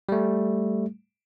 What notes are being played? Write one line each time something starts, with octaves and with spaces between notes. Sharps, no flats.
G3 A3